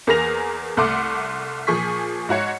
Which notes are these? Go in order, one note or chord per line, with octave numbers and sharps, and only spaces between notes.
E2 A#3 G#4 A#4 A#6 F7
C2 A3 F#5 C6 D6
A#2 F3 G#4 C#6 B6
G#2 F#4 C#5 C#7